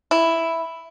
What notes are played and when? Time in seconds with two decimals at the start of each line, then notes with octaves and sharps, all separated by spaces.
0.11 E4